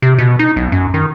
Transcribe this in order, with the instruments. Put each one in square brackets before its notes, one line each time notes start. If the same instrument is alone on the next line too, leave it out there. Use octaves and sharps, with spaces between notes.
[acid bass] C3
B2
D#4
B1
F#2
D#3